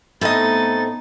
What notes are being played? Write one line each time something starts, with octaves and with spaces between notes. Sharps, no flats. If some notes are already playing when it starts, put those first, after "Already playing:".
A2 A3 B3 C4 D#4 D#5 A6